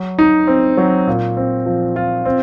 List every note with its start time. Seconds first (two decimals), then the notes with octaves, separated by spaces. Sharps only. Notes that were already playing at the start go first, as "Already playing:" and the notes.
Already playing: F#3
0.19 D#4
0.47 C4
0.77 F#3
1.07 A#2
1.37 C4
1.66 F3
1.96 F4
2.25 C4